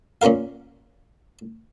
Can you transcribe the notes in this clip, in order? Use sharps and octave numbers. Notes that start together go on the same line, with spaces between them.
A#2 C#4 F4 A#4 F5